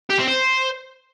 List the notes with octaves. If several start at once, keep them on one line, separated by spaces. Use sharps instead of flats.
G4
C4
C5